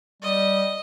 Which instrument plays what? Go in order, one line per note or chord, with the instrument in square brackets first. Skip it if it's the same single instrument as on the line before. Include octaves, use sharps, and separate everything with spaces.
[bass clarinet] G3 [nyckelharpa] D#5